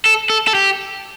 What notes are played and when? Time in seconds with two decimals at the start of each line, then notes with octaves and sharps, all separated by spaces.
0.05 A4
0.30 A4
0.48 A4
0.55 G4